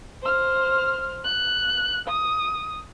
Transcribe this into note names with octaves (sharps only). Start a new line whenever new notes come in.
C5 F6
F#6
D#6